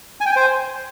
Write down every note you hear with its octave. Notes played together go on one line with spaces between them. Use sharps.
G#5
G5
G#5
C5